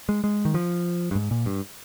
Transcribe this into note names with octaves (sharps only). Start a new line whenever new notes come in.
G#3
G#3
D#3
F3
G2
G#2
A#2
G2